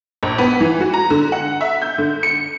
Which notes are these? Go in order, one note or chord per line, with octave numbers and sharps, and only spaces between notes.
A#1
B3
E3
F#4
A#5
D3
F#5
E5
G6
D3
C#7